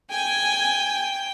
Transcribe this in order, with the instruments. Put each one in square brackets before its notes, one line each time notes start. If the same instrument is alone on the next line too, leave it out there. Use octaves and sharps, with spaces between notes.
[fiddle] G5 [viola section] G#5